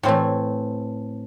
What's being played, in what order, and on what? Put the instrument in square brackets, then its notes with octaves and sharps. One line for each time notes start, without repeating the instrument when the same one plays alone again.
[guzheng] A2 E3 A3 C4 E4